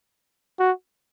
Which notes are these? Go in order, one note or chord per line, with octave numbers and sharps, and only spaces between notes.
F#4